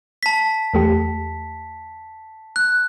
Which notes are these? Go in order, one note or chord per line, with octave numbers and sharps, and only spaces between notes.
A5 B6
E2 A3 G4
F#6